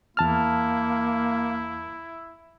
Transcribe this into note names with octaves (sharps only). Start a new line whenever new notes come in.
E2 A#3 E4 A5 F6